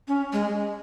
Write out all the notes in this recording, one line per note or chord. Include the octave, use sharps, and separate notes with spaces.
C#4
G#3